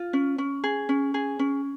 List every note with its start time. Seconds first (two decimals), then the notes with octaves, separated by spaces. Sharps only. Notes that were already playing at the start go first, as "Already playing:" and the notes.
Already playing: F4
0.13 C#4
0.38 C#4
0.64 G#4
0.89 C#4
1.14 G#4
1.39 C#4